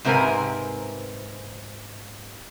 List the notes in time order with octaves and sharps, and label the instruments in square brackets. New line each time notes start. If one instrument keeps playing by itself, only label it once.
[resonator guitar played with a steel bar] G#2 C3 C4 A#4 B4 G#5